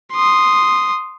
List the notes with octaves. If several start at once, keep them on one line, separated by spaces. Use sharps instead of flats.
C6 D#6